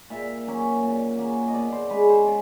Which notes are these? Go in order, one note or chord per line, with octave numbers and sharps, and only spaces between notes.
A#2 E5
F#3 A#3 C#4
A#2
F#3 A#3 C#4
D#5
B2 D5
C5
G#3 C#4 B4
C5
B2 D5